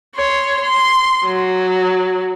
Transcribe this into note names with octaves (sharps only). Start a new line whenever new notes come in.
C#5 C6
C6
F#3